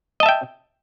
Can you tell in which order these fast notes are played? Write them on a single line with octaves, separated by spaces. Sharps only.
D#5 A5 E5 G5